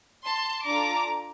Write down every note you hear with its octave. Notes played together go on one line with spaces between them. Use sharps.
A5 C6
D4 F4 A4 A#5 D6